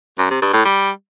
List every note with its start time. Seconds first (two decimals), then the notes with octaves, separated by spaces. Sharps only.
0.18 F#2
0.30 C3
0.42 G2
0.53 A2
0.65 G3